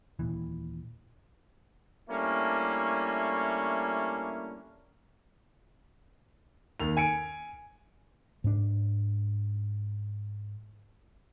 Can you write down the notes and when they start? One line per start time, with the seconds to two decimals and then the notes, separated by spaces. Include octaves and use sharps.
0.19 D#1 C#2 A#2 E3
2.09 G3 A3 A#3 C#4 D4 E4
6.80 D#2 F7
6.97 G#5 C#7 D7
8.44 G#2 D4